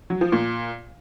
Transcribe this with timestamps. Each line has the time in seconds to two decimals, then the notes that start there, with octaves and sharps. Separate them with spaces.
0.10 F#3
0.21 F3
0.32 A#2